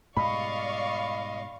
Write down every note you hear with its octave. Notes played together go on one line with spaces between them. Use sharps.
G#2 B2 G3 D5 D#5 F5 B5 C#6